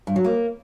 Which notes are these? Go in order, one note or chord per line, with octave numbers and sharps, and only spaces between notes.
G2
F#3
A#3